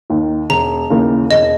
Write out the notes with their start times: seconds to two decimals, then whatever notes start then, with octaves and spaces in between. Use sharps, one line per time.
0.10 D#2 D#3
0.50 E1 A#5
0.90 D#2 C#3 E3 A#3
1.31 E1 D#5